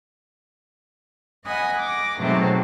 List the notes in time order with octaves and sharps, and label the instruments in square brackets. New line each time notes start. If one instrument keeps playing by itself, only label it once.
[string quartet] D#5 F#5 G#5 B5 D#6
D6 A#6
G#2 B2 F#3 A3 C4 F#4